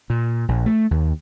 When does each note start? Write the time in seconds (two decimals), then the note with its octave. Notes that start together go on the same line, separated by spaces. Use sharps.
0.10 A#2
0.48 A#1
0.66 A3
0.91 D#2